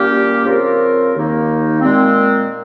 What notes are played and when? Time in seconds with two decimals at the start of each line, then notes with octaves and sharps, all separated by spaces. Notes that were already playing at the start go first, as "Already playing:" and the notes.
Already playing: A#2 G3 A#3 C#4 G4
0.44 C#3 F3 C4 F4 A#4
1.12 D#2 D#3 A#3 D#4
1.81 A#2 G#3 C4